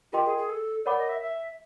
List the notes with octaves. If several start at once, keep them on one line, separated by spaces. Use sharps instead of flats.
F4 G4 A#4 D#5 G5 C6
G#4
G#4
A4
A#4 C#5 D5 F#5 B5 D6
D#5
E5
E5